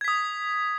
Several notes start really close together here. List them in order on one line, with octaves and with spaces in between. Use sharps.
G#6 B6 D#6